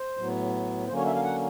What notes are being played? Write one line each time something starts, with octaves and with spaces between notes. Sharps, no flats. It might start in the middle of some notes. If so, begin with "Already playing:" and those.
Already playing: C5
A2 F#3 B3
D3 F#3 A#3 C#4 C5
C#5
E5
F5
F#5